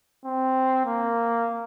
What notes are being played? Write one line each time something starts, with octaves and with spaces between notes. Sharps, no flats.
C4
A#3